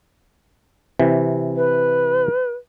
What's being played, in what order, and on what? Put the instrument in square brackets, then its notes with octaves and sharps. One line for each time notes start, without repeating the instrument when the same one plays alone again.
[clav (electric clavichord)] C3 E3
[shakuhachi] B4